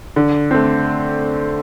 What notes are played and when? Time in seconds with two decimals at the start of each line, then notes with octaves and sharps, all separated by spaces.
0.16 D3
0.51 A3 C4